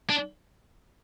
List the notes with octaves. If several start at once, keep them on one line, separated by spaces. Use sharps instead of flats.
D4